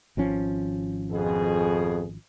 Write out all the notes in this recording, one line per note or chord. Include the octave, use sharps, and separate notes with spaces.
G#1 F3 C#4
F2 B2 G#4